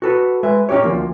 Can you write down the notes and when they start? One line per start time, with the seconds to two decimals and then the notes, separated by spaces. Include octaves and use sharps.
0.02 F#4 A4 B4
0.43 G#3 B4 E5
0.69 C#4 D#4 F4 G4 C#5
0.83 D2 F3 A#3